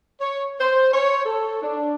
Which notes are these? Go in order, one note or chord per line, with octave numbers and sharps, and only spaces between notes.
C#5
C5
C#5
A4
D4